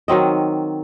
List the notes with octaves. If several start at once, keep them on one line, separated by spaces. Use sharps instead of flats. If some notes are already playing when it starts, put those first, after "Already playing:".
D#3 F#3 C4 D#5